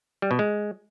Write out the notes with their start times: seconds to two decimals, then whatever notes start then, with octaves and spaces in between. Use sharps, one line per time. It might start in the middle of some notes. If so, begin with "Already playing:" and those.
0.22 G3
0.31 B2
0.39 G#3